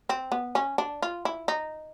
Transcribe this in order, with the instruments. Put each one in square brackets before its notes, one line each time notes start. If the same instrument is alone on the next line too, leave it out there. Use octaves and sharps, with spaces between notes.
[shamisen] C4
B3
C#4
D4
F4
E4
D#4